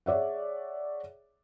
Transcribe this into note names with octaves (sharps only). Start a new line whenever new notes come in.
G#4 C#5 D5 E5 F#5